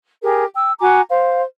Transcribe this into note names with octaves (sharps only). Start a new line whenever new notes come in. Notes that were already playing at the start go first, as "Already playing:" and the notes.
G4 G#4 A#4
G5 E6
F#4 G#5 A#5 D6
C5 F5